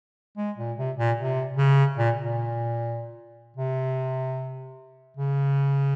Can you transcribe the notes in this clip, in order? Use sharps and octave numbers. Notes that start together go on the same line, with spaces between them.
G#3
A#2
C3
A#2
C3
C#3
A#2
A#2
C3
C#3